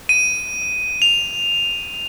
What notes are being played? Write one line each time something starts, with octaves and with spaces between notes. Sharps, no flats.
D#7
F7